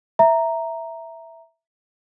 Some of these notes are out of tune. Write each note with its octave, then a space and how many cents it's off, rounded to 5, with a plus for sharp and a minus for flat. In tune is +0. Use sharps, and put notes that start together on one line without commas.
E5 +0 A#5 -5